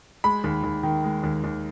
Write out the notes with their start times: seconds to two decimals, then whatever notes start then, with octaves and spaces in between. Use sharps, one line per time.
0.24 G#3 B5
0.44 D#2
0.64 D#2
0.83 D#3
1.04 G#3
1.24 D#2
1.44 D#2